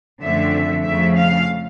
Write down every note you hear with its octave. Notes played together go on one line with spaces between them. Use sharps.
F#2 D3 F3 A3 C4 E5
F2 C#3 F3 A3 E5
F5